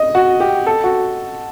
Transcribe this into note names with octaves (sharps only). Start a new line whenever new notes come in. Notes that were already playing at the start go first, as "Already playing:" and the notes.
Already playing: D#5
F#4
G4
A4
F#4